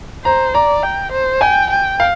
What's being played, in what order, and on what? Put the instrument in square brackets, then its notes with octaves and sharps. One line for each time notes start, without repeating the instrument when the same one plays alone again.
[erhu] C5 [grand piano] A#5
[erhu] D5 [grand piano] A#5
[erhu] G5
C5
[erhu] G5 [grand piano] G#5
[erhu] G5
[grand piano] F5